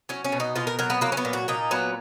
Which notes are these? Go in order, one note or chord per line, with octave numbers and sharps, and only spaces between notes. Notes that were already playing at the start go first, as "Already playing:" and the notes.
F#3 C#4
C#4
B2
D#4
B2 F4
A#4
F#3 A#4
B3
F#3 A#3
C#4
B3
A#2
F#4
A#2 D#4
F#3 B3